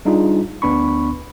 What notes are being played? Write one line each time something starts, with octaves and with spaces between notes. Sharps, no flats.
G3 D4 D#4 F4 G#4
D2 B3 D4 B5 C#6